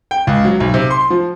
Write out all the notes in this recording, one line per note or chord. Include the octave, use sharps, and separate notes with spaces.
G5
C#2
F#3
B1
C3
C6
F3